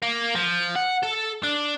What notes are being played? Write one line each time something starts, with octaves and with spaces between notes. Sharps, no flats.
A#3
F3
F#5
A4
D4